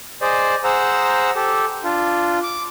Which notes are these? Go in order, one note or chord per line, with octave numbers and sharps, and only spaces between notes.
G#4 C5 D5 D#5
G#4 C5 F#5 A#5 E6
G4 A4
D4 F4
D6